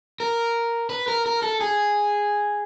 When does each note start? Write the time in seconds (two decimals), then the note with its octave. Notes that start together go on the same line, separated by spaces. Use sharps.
0.20 A#4
0.90 B4
1.08 A#4
1.26 A#4
1.42 A4
1.61 G#4